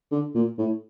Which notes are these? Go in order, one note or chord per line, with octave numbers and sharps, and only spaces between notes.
D3
A#2
A2